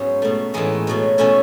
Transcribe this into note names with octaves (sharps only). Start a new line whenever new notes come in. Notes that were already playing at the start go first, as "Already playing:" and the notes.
Already playing: G#2 F#3 B3 C#4 D#4
B2 A3
A2 E3 G#3 B3 D#4
B2 F#3 A3
B2 A3 C#4 E4